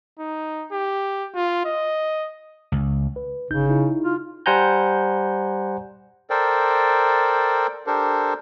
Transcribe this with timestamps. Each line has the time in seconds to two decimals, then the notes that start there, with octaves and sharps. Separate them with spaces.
0.19 D#4
0.72 G4
1.35 F4
1.65 D#5
2.72 C#2
3.16 B4
3.51 G1 C#3 D#4 G6
3.70 D#4 E4
4.04 F4
4.46 G3 C5 F#5 G#5 A#5 G6
6.30 A4 A#4 C5 D5 G5
7.87 D4 G4 A4 A#4 C5